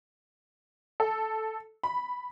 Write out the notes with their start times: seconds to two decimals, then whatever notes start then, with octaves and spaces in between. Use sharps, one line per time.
1.00 A4
1.83 B5